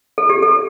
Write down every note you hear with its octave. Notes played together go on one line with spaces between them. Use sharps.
A4
G4
A4